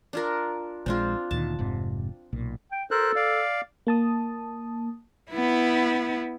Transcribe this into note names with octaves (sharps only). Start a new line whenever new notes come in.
D4 F4 A#4
A#1 G#3 C4 D4 F4
D2 A#2 D#3 A5
F1 G#2 C3
B1 A#2
G5
A4 A#4 C5 F#6
D5 F5
A#3 A5 D#6
B3 E4